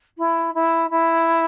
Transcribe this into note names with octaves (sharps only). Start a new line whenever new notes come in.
E4
E4
E4